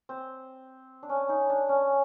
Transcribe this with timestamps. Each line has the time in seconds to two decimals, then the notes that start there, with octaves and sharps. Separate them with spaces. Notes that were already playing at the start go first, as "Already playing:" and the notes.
0.09 C4
1.03 D4
1.09 C#4
1.29 D#4
1.49 D4
1.69 C#4